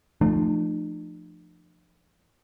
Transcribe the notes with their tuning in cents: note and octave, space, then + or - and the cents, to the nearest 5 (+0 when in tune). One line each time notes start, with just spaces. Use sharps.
F3 -15 A3 +0 D4 +45